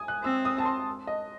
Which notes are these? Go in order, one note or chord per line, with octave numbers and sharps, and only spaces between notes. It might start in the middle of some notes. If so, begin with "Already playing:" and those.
Already playing: G#5 D#6
F#6
C4 E6
D#6
A5
C6
D#5